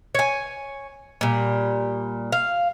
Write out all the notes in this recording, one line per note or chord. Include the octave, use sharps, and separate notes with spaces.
C#5 G#5
A#2 G3
F5